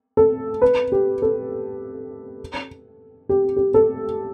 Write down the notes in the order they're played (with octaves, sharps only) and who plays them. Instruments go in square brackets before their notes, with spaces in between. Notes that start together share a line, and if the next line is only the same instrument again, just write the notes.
[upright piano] A4
B4
G4
A4
G4
G4
A4